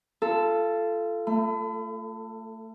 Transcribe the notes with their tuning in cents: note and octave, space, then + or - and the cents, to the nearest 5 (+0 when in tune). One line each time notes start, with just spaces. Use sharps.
F4 -25 A4 +0
A3 +25 B5 +40